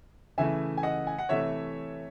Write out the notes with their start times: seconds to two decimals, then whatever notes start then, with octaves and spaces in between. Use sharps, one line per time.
0.38 C#3 E3 A3 E5 G#5
0.77 G#5
0.83 D#5 F#5
1.07 G#5
1.19 F#5
1.29 C3 E3 A3 C#5 E5